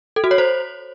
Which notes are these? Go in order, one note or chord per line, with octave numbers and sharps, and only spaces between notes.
A4
F#4
C#5
C5